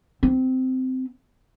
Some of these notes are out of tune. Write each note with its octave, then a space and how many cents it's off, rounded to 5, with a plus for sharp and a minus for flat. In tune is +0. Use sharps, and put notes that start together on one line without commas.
C4 -15